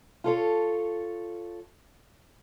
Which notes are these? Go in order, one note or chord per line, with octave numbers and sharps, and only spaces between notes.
F4 A4 C#5